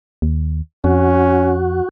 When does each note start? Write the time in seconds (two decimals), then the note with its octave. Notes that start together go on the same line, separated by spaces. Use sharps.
0.22 D#2
0.84 F2 C#4 F#4